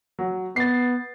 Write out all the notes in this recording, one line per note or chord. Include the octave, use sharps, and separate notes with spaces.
F#3
B3 A6 C7